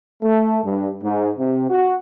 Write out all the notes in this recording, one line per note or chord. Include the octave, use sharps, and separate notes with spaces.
A3
G2
G#2
C3
F#4